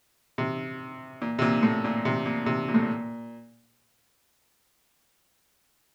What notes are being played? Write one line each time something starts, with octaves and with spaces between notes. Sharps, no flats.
C3
A#2
C3
A#2
A2
A#2
C3
A#2
C3
A#2
A2
A#2